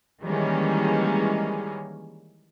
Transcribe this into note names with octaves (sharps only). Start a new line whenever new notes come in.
D#3 E3 G3 G#3 A#3 C#4